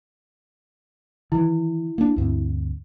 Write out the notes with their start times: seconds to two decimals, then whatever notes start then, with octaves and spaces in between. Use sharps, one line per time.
1.32 D#3 E3 E4
1.98 A#3 D4
2.16 D2 G2 C4